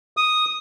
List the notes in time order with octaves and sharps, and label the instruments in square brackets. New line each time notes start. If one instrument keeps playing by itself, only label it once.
[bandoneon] D#6